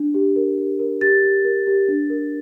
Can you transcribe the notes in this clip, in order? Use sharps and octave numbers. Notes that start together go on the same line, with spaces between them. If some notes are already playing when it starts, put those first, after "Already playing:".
Already playing: D4
G4
A#4
G4
A#4
G4 A6
G4
A#4
G4
D4
A#4